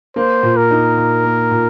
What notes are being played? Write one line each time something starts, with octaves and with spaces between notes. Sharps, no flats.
A#3 C5
A#2
A#4
D#4
A#2
A#3
A#2